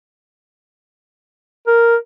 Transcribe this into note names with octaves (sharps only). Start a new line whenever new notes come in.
A#4